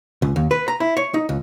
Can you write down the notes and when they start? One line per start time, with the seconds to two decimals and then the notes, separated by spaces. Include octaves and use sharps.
0.22 C#2
0.36 D#2
0.51 B4
0.68 A#5
0.80 E4
0.97 C#5
1.14 D#4
1.29 C#2